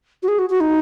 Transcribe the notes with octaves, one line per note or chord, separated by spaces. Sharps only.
F#4
G#4
F#4
F#4
D#4